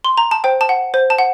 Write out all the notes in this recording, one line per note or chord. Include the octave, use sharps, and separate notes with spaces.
C6
A#5
A5
C5 G5
A5
F#5
C5
A5
F#5